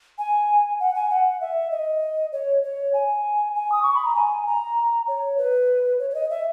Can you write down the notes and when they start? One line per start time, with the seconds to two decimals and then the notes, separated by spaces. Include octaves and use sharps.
0.18 G#5
0.80 F#5
0.95 G#5
1.10 F#5
1.41 E5
1.71 D#5
2.32 C#5
2.63 C#5
2.94 G#5
3.55 G#5
3.72 D#6
3.82 C#6
3.94 B5
4.05 A#5
4.15 G#5
4.47 A#5
5.08 C#5
5.38 B4
5.99 C#5
6.10 C#5
6.14 D#5
6.30 E5